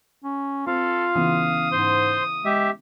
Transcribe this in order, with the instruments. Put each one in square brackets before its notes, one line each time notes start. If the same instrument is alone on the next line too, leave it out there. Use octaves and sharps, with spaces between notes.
[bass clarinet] C#4
[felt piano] C4 [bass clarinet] F4 [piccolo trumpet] A4 [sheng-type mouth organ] F5
[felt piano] C#3 E3 B3 [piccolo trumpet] D#6
[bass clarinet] G#2 [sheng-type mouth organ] C5 C6
[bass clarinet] G#3 [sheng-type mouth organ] G4 E5